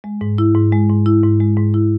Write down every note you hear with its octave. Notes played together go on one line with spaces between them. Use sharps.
G#3
G#2
E4
G#2
G#3
G#2
E4
G#2
G#3
G#2
E4